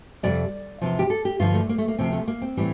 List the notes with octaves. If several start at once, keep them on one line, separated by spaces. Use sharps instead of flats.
F2 C3 G3 D5
E2 C3 F3
G4
A4
G4
G2 D3 F3 F4
A3
A#3
A3
A#3
D2 C3 F3 C4
A3
A#3
C4
A2 E3 G3